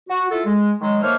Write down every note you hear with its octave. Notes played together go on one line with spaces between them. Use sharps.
F#4
E4 F4 A4
G#3
D#3 F#3 G#3
D#3 A3 A#3 C5 C#5 F6